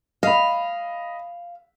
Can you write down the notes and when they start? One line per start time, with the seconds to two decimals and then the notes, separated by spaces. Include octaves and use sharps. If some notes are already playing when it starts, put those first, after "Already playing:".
0.23 D#5 F5 B5